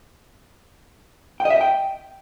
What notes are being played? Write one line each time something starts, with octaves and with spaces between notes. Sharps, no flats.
G5
D#5
E5
D#5
G5